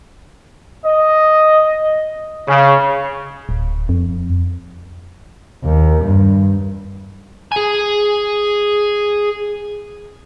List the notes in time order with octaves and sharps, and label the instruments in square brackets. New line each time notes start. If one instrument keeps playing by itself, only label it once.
[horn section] D#5
C#3
[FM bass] D1
F2
[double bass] D#2
G2
[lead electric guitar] G#4 G#5